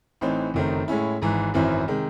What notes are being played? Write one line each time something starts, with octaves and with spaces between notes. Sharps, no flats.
A1 A2 E3 C4 D#4
F#1 F#2 D#3 A3 C4
A2 G#3 C#4 E4
G#1 G#2 E3
G#1 F#2 E3 C4 E4
C3 D#3 G#3